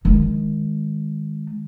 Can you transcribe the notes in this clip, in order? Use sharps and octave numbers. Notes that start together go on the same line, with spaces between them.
D#3 G#3